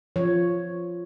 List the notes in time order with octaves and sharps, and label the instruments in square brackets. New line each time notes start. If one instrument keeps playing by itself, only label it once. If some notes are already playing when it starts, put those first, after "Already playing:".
[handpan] F3 C#5